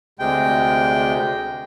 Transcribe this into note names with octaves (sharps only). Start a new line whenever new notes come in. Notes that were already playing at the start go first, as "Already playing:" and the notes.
D2 C3 G#3 G5